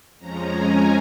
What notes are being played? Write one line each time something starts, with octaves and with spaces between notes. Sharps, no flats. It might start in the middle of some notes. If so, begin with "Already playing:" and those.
F2 F3 G#3 C#4 A#5
G#5